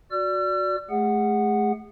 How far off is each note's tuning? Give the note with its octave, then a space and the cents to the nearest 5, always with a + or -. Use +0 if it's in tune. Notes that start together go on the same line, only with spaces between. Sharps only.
F#4 -10 D5 -10 E6 +45
A3 -35 G#4 -30 F#5 +0